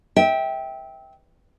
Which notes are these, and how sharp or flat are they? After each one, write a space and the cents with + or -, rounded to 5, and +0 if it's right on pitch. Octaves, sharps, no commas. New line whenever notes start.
E5 -25 G5 +0